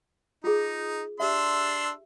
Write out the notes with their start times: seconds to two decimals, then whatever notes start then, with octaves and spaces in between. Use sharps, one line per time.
0.44 D#4 F4 G#4
1.20 D4 G4 E5 C6 E6